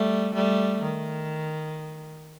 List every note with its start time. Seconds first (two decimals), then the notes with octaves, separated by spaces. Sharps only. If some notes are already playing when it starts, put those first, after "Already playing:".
Already playing: G3 A3
0.34 G3 A3
0.82 D#3